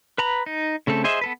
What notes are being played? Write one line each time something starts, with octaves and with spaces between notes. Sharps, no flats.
B4 A#5 B5
D#4
C#3 A3 C4 A4
G#4 C5 D#5 E5
B3 A4 B4